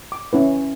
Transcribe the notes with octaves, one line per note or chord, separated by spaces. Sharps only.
D6
C#4 E4 B4